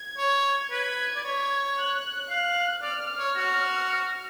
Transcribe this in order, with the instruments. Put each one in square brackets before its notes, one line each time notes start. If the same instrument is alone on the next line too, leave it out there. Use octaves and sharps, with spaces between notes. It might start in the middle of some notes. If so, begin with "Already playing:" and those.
Already playing: [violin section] G#6
[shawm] C#5
[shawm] B4 [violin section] G#6
[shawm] D5
C#5
[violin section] F#6
[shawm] F5
[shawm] D5 [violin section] F6
[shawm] C#5
F#4